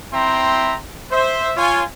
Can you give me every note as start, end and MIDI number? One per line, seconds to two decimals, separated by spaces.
0.12 0.75 60
0.12 0.75 64
0.12 0.75 76
0.12 0.75 79
0.12 0.75 82
0.12 0.75 84
1.11 1.51 72
1.11 1.51 76
1.57 1.83 65
1.57 1.83 73
1.57 1.83 80